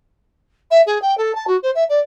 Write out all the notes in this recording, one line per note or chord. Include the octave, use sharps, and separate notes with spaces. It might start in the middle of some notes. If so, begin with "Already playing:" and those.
E5
G#4
G5
A4
A5
F#4
C5
E5
D5